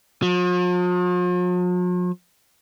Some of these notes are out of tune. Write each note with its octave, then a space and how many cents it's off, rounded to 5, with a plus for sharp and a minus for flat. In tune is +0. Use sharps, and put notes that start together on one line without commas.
F3 +45